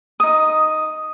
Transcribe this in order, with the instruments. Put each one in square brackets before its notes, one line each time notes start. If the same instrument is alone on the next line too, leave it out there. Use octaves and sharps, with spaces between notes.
[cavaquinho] D#4 D#6